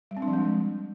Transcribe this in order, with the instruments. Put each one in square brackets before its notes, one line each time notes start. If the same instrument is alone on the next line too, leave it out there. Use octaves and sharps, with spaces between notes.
[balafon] G3
C4
D4
F3
G#3